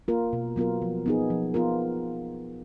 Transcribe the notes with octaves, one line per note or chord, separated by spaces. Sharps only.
A#3 F4 A#4
B2
F#3 B3 F4 A#4
F3
B3 D#4 G#4
F3
B3 F4 A#4